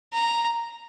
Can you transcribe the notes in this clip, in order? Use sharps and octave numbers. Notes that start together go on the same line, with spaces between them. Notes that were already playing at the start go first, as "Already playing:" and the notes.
A#5